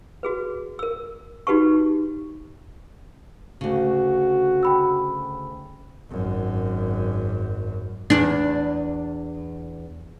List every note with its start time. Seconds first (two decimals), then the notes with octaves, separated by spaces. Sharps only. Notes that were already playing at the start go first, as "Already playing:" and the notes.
0.23 F#4 G#4 B4
0.79 A#4 E6
1.47 D#4 F#4 G4 B4 A5 C#6
3.61 D2 C#3 F#4
4.63 G5 B5 E6
6.11 G#1 F#2
8.10 E2 D4